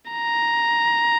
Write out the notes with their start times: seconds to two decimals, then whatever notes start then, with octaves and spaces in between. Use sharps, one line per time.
0.11 A#5